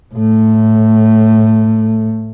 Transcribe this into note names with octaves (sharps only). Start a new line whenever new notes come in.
A2 A3